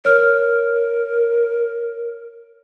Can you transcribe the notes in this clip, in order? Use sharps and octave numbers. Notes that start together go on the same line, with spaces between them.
A#4 C#5 F6